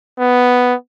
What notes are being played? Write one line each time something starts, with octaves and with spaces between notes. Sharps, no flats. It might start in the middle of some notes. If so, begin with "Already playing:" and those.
B3